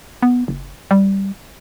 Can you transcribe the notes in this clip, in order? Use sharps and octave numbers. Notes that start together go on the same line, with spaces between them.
B3
F#1
G3